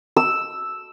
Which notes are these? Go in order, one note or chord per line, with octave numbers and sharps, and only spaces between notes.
E6